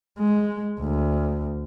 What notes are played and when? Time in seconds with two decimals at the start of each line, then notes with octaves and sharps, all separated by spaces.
0.19 G#3
0.80 D2